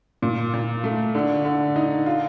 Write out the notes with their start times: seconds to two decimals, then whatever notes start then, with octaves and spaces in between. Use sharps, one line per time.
0.22 A#2
0.53 A#2
0.84 A3
1.15 D3
1.45 D3
1.76 D#4
2.06 F4